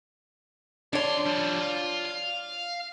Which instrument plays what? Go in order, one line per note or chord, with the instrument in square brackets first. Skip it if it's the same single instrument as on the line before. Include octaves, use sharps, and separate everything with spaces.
[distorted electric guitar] F2 C6 [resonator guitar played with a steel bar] D4 C#5
[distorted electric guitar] F3 G3
F4
F5